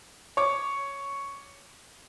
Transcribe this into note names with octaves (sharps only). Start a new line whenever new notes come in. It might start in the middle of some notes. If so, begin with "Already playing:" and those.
C#5 D6